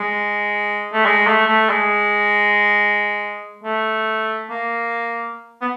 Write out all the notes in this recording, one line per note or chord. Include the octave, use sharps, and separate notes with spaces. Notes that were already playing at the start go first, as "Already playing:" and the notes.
Already playing: G#3
A3
G#3
A3
A3
G#3
A3
A#3
B3